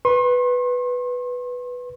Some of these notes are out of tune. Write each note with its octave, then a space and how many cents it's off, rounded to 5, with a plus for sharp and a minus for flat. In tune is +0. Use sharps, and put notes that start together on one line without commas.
B4 +0 C6 +45